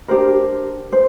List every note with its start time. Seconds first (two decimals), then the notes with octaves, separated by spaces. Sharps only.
0.08 D4 G4 A#4 C5
0.92 C5